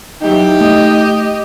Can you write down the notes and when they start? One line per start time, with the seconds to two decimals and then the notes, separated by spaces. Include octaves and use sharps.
0.22 E3 F#3 D#4 G4
0.61 A3 D#5